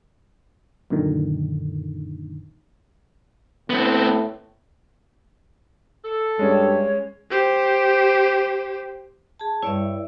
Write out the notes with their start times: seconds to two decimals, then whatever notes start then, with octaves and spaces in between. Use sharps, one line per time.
0.90 F#2 A#2 D3 D#3
3.70 A2 B3 C4
6.05 A4
6.39 G2 G#3 C#4 C#5
7.30 G4 C5
9.39 G#4 A5
9.63 G2 E4 C#5 D5 E5